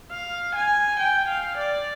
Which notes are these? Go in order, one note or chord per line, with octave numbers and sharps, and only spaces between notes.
F5
G#5
G5
F5
D5